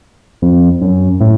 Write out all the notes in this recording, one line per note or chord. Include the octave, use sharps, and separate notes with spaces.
F2
F#2
A2